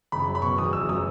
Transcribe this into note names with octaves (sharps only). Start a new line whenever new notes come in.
F#1 B5
F#3
B5
B2 C#6
E2 D#6
F#1 E6
F#3 D#6